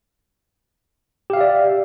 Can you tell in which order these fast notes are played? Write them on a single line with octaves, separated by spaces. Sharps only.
G4 F5 E5 D5